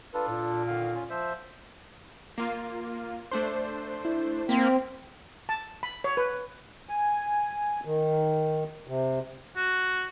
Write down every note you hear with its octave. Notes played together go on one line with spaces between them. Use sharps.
D4 F4 A4 B4
A#2
D3 D#3 F5
C#4 F4
F3 C5 E5
A#3 F4
A3 D4 C5
E4
A#3 C4 B6
A5
B5
C#5
B4
G#5
D#3
C3
F#4